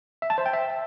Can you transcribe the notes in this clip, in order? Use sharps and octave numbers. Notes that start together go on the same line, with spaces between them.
E5
A5
C5
G5
E5